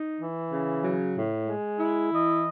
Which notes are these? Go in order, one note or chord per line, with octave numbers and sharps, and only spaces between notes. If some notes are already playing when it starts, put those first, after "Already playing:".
Already playing: D#4
E3
C#3
F#3
A2
G#3
E4
E3 D#5